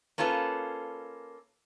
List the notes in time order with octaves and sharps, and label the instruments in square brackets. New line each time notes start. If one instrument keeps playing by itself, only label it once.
[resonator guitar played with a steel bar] A#3 C#4 F4 A4 B4